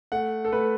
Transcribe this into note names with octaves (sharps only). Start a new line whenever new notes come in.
A3 F#5
A4
A3 B4